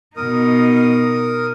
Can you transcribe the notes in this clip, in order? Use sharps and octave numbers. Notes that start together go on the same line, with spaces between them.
B2 D#4 A#4 D#6